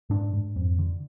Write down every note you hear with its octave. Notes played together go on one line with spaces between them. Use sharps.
G#2 D4
G#2
F2
D3